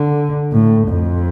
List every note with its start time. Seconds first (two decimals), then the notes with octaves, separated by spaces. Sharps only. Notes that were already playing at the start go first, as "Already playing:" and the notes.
Already playing: D3
0.52 A2
0.88 F2